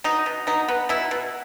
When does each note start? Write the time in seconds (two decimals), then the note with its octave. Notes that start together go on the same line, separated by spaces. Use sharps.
0.04 B2 D#4
0.26 B2
0.47 B2 D#4
0.68 B3
0.89 B2 E4
1.11 B2